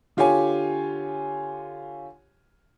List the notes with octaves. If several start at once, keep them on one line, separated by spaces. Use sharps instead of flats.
D3 F4 G4 C#5 G#5